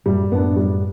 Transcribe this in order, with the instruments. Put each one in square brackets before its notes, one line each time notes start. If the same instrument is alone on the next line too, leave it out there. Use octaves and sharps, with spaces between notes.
[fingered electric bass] F#2 A2 [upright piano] G3
[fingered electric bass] F#2 A2 [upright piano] B3 D4
[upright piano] G3